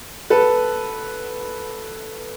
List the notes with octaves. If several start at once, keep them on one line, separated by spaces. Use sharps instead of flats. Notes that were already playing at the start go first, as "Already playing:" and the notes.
A4 B4